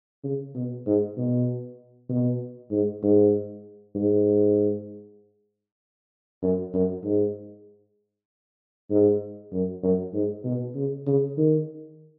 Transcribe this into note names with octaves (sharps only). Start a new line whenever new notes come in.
C#3
B2
G#2
B2
B2
G#2
G#2
G#2
F#2
F#2
G#2
G#2
F#2
F#2
G#2
B2
C#3
C#3
D#3